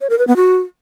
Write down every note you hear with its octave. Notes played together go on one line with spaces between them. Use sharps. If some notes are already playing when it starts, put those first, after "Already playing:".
C#5
A#4
B4
B3
F#4